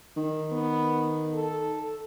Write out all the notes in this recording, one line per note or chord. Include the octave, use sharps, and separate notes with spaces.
D#3
B3
A4